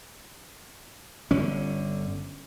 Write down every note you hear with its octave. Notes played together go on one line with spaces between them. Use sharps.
G1 D3 C#4